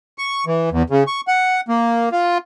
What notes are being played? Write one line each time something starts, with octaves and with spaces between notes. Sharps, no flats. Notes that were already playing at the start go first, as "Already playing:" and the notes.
C#6
E3
E2
C#3
C#6
F#5
A#3
F4